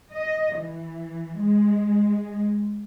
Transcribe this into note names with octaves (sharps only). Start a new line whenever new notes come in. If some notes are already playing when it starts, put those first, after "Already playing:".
D#5
E3
G#3